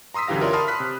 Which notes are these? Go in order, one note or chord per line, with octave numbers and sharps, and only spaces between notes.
A#5 C6 D#6 E6 B6
F#2 D3 E3 G4 F5 A#6
F4 A#4 C#5 D5 E5 C6
A5 B5 C6 D#6 F6
B5 C6 F#6 B6
C3